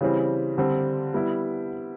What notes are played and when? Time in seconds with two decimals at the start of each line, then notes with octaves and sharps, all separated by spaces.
0.01 C#3 E3 G3 C4
0.58 D3 G3 C4
1.14 G3 B3 E4